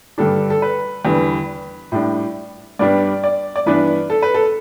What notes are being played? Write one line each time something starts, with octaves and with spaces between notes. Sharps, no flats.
G2 D3 G3 D4 A4
A4
B4
E2 D3 G3 B3
A2 G3 D4
G2 G3 B3 D4 D5
D5
D5
G2 E3 B3 D4 B4
A4
B4
A4